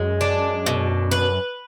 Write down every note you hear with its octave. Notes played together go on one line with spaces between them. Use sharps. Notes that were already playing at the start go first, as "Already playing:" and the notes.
Already playing: F#2 G#3
D4
B2
B4